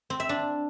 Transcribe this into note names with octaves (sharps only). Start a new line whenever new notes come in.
C4
E5
D4